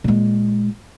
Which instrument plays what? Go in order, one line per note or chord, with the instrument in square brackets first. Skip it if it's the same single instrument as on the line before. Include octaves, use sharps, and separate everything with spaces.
[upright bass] A#2 G#3